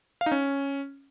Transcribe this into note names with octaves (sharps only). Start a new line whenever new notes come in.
F5
D#4
C#4